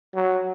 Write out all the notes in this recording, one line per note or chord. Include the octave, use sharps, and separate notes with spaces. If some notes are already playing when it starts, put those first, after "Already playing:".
F#3